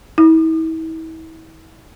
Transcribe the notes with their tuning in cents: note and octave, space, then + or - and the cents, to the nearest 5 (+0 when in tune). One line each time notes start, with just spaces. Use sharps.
E4 -40